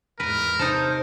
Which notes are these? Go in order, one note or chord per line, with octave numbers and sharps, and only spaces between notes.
E2 G#2 A#4 B4
C3 D#4 A4 C5